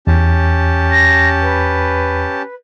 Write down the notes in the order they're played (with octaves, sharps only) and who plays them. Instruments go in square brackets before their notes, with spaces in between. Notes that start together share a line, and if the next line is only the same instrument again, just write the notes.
[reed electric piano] E2 [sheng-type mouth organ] C#4 G4 A5
[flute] A#6
B4